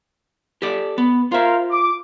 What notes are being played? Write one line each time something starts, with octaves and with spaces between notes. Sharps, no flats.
G4 A4 D5
B3
F4 A#4 C5 E5 F5
D6